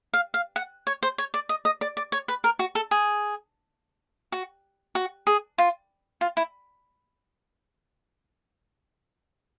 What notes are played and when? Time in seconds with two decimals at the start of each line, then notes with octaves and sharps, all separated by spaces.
0.13 F5
0.34 F5
0.56 F#5
0.87 C#5
1.03 C5
1.18 C#5
1.34 D5
1.49 D#5
1.65 D#5
1.81 D5
1.97 D5
2.12 C#5
2.28 B4
2.44 A#4
2.59 F#4
2.75 A4
2.91 G#4
4.32 F#4
4.95 F#4
5.27 G#4
5.58 F4
6.21 F4
6.37 E4